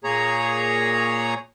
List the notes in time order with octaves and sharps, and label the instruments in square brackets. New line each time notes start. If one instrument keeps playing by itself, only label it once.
[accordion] A#2 A#3 G#4 C#5 A#5